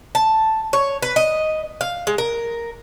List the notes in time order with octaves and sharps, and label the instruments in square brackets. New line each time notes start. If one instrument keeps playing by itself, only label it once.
[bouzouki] A5
C#5
B4
D#5
F5
G#3
A#4